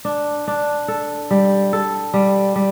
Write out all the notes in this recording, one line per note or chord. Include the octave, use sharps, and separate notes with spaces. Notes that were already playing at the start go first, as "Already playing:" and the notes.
D4
D4
A4
G3
A4
G3
G3